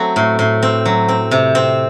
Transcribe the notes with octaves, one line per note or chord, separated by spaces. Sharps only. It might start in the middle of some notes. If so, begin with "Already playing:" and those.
Already playing: F#3 A3 C4 F#4
A2
A2
C4
F#3
C4
C3
C4